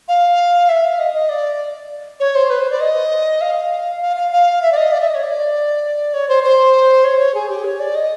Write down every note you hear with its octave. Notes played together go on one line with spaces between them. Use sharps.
F5
E5
F5
D#5
D#5
D5
C#5
C5
B4
C5
D5
D#5
F5
F5
F5
F5
E5
D5
D#5
D5
E5
D#5
C#5
D5
C#5
C5
C5
C#5
C#5
G#4
G4
C#5
D5
D#5